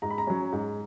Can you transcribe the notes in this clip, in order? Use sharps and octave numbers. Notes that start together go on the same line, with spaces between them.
G#2 A#5
B5
A#5
F#3 C#4
G#2